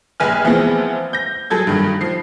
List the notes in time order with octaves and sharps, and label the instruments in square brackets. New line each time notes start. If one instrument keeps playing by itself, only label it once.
[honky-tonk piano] F1 A#1 B4 G#5 F6
E3 F3 G#3 B3 C4
G6 A#6
F#3 G#4 A4 G#6
G2 D#3
F3 C7